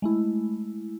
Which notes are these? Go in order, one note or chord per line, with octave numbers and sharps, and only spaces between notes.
G#3 A3 E4